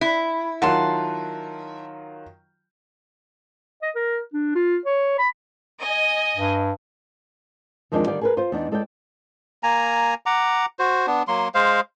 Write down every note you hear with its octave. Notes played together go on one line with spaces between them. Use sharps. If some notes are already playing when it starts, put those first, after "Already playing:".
E4
D#3 F#3 F4 F#5 A5 C6
D#5
A#4
D4
F4
C#5
B5
D#5 G#5
G2
F2 D#3 F3 G#3 C4 D4
D3 D#3 G3 D5 F5 G5
G#4 A#4 B4
F4 C5
E2 D4 D#4
G#3 A4 C#5 D5 G5
A#3 G#5 A#5
F#5 A#5 D6
F#4 C5
B3 D4
F#3 A#3 C6
G#3 C5 F5